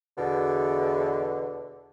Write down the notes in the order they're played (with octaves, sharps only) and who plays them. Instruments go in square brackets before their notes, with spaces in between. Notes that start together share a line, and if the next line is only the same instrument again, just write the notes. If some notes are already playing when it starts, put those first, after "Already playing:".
[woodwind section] E2 B2 D3